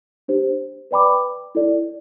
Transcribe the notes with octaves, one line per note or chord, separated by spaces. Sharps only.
D4 G4 C5
B4 D5 G5 B5 D6
E4 A4 D5